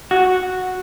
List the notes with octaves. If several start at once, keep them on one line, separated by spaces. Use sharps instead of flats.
F#4